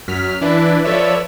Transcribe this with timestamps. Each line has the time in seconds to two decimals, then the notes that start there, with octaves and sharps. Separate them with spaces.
0.08 F#2 F#3 F6 B6
0.41 E3 D4 E4 B4
0.84 F3 A4 B4 C#5 D5 E5